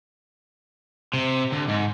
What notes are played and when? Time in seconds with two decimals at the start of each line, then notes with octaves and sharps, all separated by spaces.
1.14 C3
1.52 D2
1.68 G#2